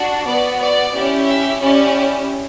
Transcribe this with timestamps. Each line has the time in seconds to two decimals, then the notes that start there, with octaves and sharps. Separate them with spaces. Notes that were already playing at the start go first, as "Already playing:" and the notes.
Already playing: D4 F#4
0.27 B3 F#4 D5
0.61 D5
0.94 C#4 E4 G4
1.28 E5
1.60 C#4 E4 G4 D5